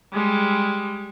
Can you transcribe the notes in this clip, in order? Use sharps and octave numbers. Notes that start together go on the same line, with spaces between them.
G3 G#3